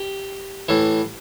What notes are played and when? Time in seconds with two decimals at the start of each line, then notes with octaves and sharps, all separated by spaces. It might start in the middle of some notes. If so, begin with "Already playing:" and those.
Already playing: G4
0.69 A2 E3